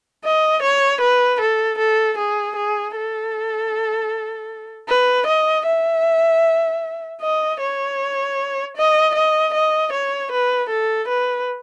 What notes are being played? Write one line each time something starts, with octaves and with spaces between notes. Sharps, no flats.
D#5
C#5
B4
A4
A4
G#4
G#4
A4
B4
D#5
E5
D#5
C#5
D#5
D#5
D#5
C#5
B4
A4
B4